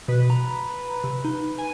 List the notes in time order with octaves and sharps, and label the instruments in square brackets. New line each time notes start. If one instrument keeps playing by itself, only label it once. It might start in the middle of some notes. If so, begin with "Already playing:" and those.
[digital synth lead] B2 [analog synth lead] B4
[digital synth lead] A#5
C3
D#4
[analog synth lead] G#5